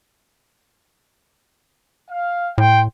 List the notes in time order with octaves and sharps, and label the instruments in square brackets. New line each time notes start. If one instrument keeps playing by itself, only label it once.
[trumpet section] F5
[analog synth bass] A2 [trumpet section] G5 C6